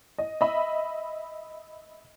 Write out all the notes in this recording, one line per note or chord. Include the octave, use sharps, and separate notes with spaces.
D#5
D#5 E5 B5